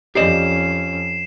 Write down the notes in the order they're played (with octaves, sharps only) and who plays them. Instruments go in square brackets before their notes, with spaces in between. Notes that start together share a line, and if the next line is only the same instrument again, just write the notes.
[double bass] F2 C#4 [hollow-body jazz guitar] G4 D5 D#5 [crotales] C7 E7